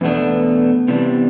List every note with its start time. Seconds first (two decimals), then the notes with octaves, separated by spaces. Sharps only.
0.01 E2 B2 A3 B3 D4
0.88 C3 E3 G3 D4